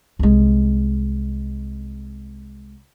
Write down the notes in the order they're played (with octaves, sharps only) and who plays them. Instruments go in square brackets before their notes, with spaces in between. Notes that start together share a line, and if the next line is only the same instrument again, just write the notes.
[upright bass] C2 G#3